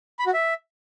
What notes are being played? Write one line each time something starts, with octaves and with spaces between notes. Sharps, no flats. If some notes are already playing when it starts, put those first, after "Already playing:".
B5
F#4
E5